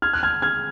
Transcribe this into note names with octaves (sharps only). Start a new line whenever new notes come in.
F6 G#6
F#6
F6 G#6
F6 G#6